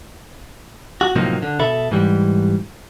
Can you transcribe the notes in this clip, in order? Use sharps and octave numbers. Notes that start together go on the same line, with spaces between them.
F#4
A2 C3 F3 F#3 A#3 D#4
D3
B2 A4 E5 B5
G#2 E3 G3